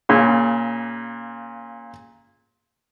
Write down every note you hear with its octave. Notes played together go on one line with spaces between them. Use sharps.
A#2 C#3